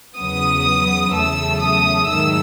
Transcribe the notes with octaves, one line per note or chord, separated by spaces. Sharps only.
E2 C#3 F#3 B3 D#6
E2 C#3 F#3 A3 E6
D#6
G#2 D#3 F#3 A3 E6